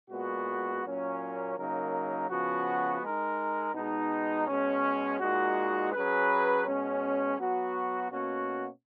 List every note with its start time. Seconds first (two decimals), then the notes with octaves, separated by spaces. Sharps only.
0.10 A#2 G#3 B3 F#4
0.83 A#2 F#3 A#3 C#4
1.56 C#3 F#3 A#3 D#4 A#4
2.28 C#3 F3 B3 F#4
3.01 G#3 D#4 A#4
3.74 B2 G#3 D#4
4.47 B2 G#3 C#4
5.20 A#2 G#3 D#4 F#4
5.92 F#3 C#4 G#4 B4
6.65 B2 G#3 C#4
7.38 F#3 B3 F#4
8.10 B2 A#3 C#4 F#4